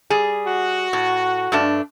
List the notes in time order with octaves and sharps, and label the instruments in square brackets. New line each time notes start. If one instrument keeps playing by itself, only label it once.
[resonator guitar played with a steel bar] G3 G#4
[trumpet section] F#4
[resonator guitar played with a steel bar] A2
G2 A3 D4